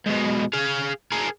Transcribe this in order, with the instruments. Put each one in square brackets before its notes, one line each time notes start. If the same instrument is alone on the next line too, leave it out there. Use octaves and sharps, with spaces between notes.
[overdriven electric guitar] G#2 B2
G#4 F5
G#4 A#4